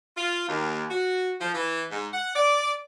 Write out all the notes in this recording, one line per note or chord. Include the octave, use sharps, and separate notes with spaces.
F4
D#2
F#4
F3
E3
G#2
F#5
D5